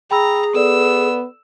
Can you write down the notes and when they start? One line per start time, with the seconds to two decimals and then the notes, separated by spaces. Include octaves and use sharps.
0.11 G#4 G5 A#5 B5 E6
0.55 B3 A4 D5 E6